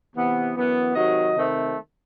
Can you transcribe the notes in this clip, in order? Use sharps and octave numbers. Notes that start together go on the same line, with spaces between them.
C3 E3 B3
F#2 E3 B3
C3 D#3 F#3 D#5
C3 D#3 A3 C4